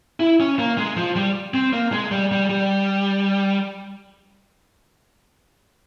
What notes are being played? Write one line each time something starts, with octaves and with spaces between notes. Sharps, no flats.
E4
C#4
A#3
G#3
F3
G3
C4
A#3
G#3
G3
G3
G3